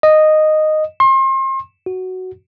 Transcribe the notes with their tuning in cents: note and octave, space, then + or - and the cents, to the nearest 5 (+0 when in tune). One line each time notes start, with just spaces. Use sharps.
D#5 -10
C6 +35
F#4 +5